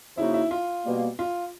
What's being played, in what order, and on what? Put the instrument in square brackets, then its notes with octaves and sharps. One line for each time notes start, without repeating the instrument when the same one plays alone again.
[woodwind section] C#3 F3 A#3 D#4 F#4 [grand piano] E4
[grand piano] E4
F4
[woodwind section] B2 G3 A#3
[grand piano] F4